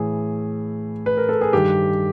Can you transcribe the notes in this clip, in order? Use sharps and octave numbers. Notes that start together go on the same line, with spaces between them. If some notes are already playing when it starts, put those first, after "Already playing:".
Already playing: A2 E3 G#4
B4
A#4
A4
G#4
G2 D#3 G4